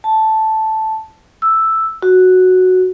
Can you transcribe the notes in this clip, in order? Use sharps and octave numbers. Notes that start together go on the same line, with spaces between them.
A5
E6
F#4